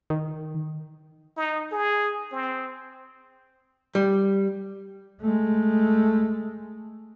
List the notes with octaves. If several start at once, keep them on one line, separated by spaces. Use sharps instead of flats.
D#3
D#4
G#4
C4
G3
G#3 A3